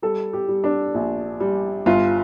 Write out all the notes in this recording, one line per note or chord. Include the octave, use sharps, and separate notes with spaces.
G3 A4
G4
G3
D4
A#1
G3
G1 F4